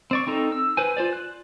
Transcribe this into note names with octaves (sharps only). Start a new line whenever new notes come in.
C4 D5 C#6
C4 D#4 A4 A#5
E6
B4 C5 G#5
F4 C5 D5
F#6